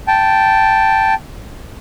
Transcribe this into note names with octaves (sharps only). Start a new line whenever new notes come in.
G5 A5